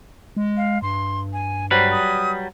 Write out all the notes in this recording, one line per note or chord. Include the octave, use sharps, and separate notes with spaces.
G#3
F5
G2 C6
G#5
F#3 G3 B4 C5
D#6